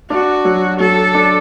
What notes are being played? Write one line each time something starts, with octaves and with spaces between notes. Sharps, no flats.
D4 F#4
F#3
F#3 A4
D4